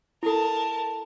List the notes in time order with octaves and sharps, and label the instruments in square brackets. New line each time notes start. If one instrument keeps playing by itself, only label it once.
[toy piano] E4 A4 [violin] A#4 A5